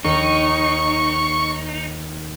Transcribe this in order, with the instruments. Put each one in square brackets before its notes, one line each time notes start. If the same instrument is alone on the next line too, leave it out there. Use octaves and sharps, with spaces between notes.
[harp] D#2 [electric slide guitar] D#4 [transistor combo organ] C#6